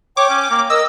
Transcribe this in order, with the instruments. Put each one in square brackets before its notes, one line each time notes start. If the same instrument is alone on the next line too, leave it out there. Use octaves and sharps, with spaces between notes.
[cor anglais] C#5 [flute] G5 [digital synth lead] D6
[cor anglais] C#4
A#3
[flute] A#4 [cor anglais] D#5 [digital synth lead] E6